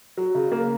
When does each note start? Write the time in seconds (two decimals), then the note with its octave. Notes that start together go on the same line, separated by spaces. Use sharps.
0.17 F#3
0.35 C#3
0.52 A#3